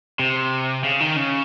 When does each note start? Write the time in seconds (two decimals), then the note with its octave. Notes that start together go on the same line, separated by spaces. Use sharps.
0.19 C3
0.84 C#3
1.00 D#3
1.16 C#3